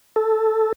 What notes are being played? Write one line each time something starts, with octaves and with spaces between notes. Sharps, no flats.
A4